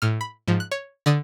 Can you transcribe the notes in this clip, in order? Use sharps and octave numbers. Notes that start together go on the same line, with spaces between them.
A2 F6
B5
G#2 F3
F#6
C#5
D3 D5 D#6 A6